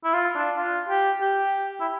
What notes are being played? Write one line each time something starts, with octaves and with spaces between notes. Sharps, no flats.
E4
F4
D4
F4
G4
G4
E4